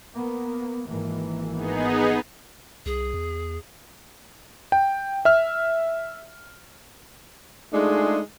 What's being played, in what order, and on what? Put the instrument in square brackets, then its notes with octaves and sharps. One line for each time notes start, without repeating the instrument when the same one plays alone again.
[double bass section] A#3 B3
G#1 E3 A#3
[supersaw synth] B3 D#4 G#4
[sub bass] C2 [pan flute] G#4
[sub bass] E2
[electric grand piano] G5
E5 F6
[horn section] G#3 A3 D4 D#4 F4 G#4